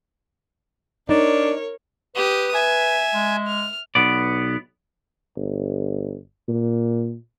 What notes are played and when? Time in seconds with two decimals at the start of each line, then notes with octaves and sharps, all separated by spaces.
1.09 D4 D#4 A#4 C#5
2.16 G4 B4 D#6
2.54 E5 G#5
3.14 G#3
3.48 F6
3.95 B1 B3 D5
5.36 G1
6.48 A#2